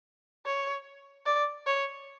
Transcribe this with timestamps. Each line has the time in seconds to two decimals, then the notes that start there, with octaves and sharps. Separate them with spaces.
0.46 C#5
1.26 D5
1.67 C#5